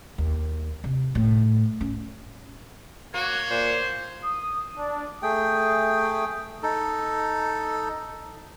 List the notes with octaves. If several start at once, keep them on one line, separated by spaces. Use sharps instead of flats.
D#2
C3
A2
C#4
A#3 F#4 C#5
A#2 C5
D#6
D4
A3 G#4 G5
D#4 A4